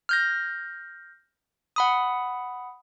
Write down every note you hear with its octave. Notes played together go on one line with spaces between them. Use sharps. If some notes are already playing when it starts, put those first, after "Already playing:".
F6 G6 A#6
F#5 B5 D#6